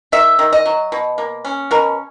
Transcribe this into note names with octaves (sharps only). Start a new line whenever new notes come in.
D#3 E5
D#3
D#5
F#3
B2
A#3
C#4
B2 A#4